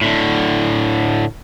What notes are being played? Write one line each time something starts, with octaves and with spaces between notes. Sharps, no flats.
A2 D3